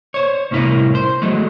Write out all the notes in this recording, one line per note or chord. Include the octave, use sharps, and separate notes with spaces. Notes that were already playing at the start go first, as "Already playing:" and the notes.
C5 C#5
C2 A2 C#4 E4 A#4
C5
F#3 G#3 A3